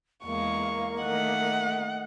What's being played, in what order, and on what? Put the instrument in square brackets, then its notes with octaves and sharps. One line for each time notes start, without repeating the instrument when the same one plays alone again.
[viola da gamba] E2 G#3 [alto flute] A#3 [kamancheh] F5 C#6
[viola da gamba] D#3 A3 [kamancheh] D#5 [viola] F#5